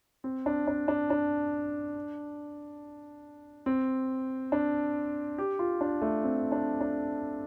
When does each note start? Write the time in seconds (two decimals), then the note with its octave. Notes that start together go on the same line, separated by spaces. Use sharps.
0.24 C4
0.46 D4
0.67 D4
0.88 D4
1.10 D4
3.66 C4
4.52 D4
5.38 G4
5.59 F4
5.81 D4
6.02 A3
6.24 C4
6.52 D4
6.81 D4